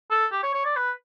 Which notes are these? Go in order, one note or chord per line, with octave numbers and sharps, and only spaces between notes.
A4
G4
C#5
C#5
D5
B4